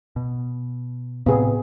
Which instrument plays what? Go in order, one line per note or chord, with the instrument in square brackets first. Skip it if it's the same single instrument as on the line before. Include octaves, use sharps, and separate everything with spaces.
[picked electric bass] B2
[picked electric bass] A2 C3 C4 [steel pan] B3 G#4